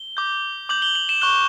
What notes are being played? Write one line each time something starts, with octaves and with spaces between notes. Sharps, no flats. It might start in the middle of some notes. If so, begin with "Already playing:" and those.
Already playing: G7
D6 G6
D6 G6 F#7
G7
F#7
E7
C#6 F#6 G7